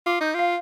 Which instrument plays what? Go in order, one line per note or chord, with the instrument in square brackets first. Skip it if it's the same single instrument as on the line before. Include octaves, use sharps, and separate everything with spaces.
[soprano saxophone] F4 [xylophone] D6
[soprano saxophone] D#4 [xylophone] G6
[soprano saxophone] F4 [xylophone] F5